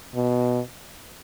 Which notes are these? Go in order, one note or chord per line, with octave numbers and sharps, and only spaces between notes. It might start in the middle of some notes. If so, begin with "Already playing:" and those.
B2